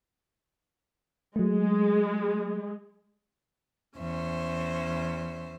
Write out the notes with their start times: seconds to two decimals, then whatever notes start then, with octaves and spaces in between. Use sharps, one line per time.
1.36 F#3 G#3 A3
3.96 E2 C#4 C5 E5